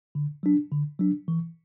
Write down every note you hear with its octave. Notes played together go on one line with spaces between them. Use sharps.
D3
F#3 D4
D3
F#3 D4
E3